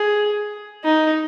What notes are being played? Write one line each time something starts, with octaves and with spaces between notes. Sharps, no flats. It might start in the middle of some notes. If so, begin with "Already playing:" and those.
Already playing: G#4
D#4